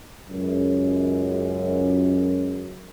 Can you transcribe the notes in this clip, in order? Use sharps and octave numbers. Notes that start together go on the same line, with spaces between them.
C#2 F#2